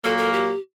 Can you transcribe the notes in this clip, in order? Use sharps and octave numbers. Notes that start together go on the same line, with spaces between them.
A#2 F#3 A#3 A4
A4
G4